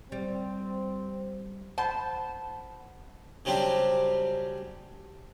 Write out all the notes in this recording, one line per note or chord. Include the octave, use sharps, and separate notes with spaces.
G3 C4
C5 F#5 A5 B5
C#3 F#3 G3 C4 D4 G4